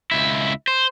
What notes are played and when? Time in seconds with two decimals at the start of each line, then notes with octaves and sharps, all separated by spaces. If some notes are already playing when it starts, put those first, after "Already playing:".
0.11 C#2 E4
0.68 C5